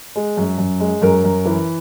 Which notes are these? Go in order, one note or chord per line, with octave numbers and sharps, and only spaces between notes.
G#3
F#2
F#2
G#3
F#2 A#4
F#2
E3